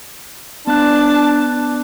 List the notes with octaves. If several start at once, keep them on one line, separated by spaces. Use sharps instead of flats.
B3 D4 A5 F#6